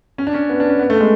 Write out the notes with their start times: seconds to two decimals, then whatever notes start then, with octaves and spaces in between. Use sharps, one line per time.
0.18 C#4
0.27 D4
0.34 C#4
0.50 B3
0.60 D4
0.70 C#4
0.79 B3
0.90 A3
1.01 G#3